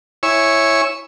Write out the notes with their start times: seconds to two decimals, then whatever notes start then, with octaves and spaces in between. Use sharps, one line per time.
0.23 E4 C#5 G#5 C#6 E6